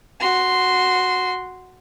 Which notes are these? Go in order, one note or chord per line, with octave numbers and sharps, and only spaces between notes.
F#4 C6